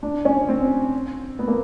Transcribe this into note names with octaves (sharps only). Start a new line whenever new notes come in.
D4
C#4
C4
B3
A#3